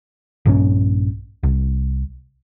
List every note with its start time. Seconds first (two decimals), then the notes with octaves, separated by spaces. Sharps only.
0.45 A#1 G2 D#3 C#4
1.43 C2